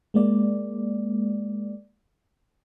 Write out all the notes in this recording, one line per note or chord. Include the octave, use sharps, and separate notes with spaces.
G#3 A#3 D5